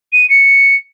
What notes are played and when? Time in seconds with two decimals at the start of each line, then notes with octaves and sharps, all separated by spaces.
0.13 D#7
0.30 C#7